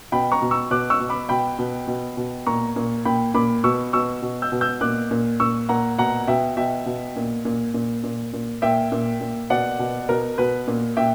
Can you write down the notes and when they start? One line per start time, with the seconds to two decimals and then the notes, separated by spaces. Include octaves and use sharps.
0.12 B2 G5 B5
0.32 A#5 C#6
0.42 B2
0.51 C#6 E6
0.71 B2 D6 F#6
0.90 C#6 E6
1.00 B2
1.09 B5 D6
1.29 B2 G5 B5
1.59 B2
1.88 B2
2.17 B2
2.47 A#2 A#5 C#6
2.76 A#2
3.05 A#2 G5 B5
3.34 A#2 B5 D6
3.64 B2 C#6 E6
3.93 B2 C#6 E6
4.22 B2
4.42 E6 G6
4.52 B2
4.61 E6 G6
4.81 A#2 D6 F#6
5.11 A#2
5.40 A#2 C#6 E6
5.69 A#2 F#5 A#5
5.98 B2 F#5 A#5
6.27 B2 E5 G5
6.57 B2 E5 G5
6.86 B2
7.16 A#2
7.45 A#2
7.74 A#2
8.04 A#2
8.33 A#2
8.62 A#2 E5 G5
8.92 A#2
9.21 A#2
9.50 B2 D5 F#5
9.79 B2
10.09 B2 A#4
10.38 B2 B4
10.68 A#2
10.97 A#2 E5 G5